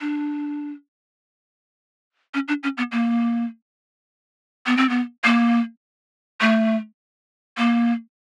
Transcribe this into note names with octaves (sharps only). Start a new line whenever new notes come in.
D4
C#4
D4
C#4
B3
A#3
B3
C4
B3
A#3
A3
A#3